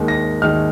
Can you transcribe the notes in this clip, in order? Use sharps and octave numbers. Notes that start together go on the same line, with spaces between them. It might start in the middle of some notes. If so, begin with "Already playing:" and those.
Already playing: D#2 D#3 G#3
A#6
D#2 D#3 G#3 F6